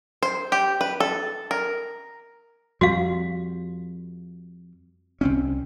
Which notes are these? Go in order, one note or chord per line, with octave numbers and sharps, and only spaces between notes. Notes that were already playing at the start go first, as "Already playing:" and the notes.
C5
G4
B4
A4
A#4
F2 G3 F#4 F5
C2 C4 C#4